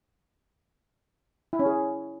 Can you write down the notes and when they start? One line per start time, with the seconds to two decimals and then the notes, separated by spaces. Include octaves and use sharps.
1.53 E4
1.59 C#4
1.66 G#4